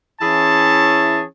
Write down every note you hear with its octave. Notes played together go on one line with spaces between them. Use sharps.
E3 C#4 E4 G#4 C#5 A5